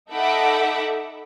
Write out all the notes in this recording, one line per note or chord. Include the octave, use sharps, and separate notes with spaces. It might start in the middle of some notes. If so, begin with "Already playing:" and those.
D#4 A4 E5 F#5 B5 D6